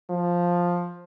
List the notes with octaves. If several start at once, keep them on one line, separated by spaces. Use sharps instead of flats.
F3